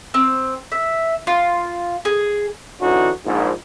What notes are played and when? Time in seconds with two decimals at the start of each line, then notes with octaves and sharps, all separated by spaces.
0.14 C4
0.72 E5
1.27 F4
2.05 G#4
2.81 D3 E3 C#4 D#4 F#4
3.25 A#1 G#2